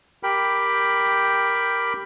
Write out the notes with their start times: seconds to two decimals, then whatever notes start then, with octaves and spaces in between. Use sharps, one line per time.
0.23 G4 A#4 G5 B5